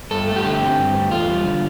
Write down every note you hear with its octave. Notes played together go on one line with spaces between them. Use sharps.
G2 A4
A3
G4
D3
C4
G2
A3
E2 F4
G3
D3